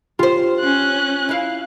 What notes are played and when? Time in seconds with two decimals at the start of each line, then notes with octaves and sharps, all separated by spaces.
0.19 F4 G4 C5
0.60 C#4 F#6
1.29 E4 F5